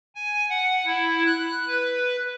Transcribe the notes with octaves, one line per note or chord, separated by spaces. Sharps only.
G#5
F#5
E4
F#6
B4